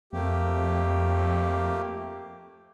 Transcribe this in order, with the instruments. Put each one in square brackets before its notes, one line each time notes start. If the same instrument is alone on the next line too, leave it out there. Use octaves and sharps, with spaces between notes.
[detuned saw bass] F2 [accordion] A3 A#3 G4